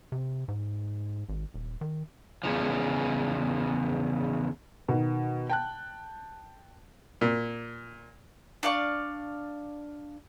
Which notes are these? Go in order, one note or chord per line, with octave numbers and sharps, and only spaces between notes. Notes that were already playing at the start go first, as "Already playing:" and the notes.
C3
G#2
G#1
D#1
D#3
E2 C#3 F3
B2 D#3
G5 A5 F#6
A#2
D4 D5 F5 C#6